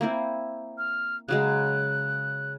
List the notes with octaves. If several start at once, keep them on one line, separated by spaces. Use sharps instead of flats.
A#3 C4 E4
F6
C#3 F#3 G#3 F#6